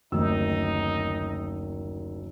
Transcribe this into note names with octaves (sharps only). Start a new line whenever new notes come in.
F#1 D2 C3 D#3 D#4 E6